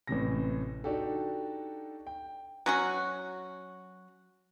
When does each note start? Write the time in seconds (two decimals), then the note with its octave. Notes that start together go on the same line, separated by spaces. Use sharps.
0.07 A1 A2 C3 A#6
0.84 D4 D#4 F#4 G4 A4
2.07 G5
2.66 F#3 C#4 F#4